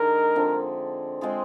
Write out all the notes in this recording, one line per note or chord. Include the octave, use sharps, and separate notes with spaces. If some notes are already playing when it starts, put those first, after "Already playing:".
Already playing: D3 G#3 D#4 G#4 A#4
D3 F3 C4
G#3 C4 F4 G#4